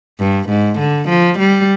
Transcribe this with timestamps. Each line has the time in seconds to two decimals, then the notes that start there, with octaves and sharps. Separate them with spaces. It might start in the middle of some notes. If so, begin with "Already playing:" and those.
0.20 G2
0.50 G#2
0.79 D3
1.09 F3
1.39 G3